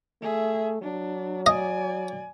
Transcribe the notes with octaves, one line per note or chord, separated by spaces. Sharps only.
A3 G#4 E5
F#3 D4
D5 D#5 G#5